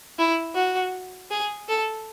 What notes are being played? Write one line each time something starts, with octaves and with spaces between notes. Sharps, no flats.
E4
F#4
G#4
A4